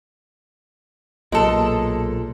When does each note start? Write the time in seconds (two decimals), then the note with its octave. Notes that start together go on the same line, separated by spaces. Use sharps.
1.32 B1 A#2 G#3 A4